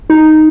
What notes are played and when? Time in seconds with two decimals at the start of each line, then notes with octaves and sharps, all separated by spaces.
0.10 D#4